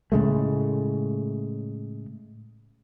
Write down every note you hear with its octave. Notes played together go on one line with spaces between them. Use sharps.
A2 C#3 G#3 A3